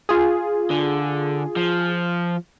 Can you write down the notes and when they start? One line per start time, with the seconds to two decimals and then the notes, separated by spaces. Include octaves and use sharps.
0.09 F4 G#4
0.70 D3
1.56 F3